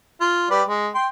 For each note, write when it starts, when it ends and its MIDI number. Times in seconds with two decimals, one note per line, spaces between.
0.21 0.49 65
0.51 0.62 55
0.51 0.62 71
0.51 0.62 74
0.68 0.89 56
0.95 1.07 79
0.95 1.07 84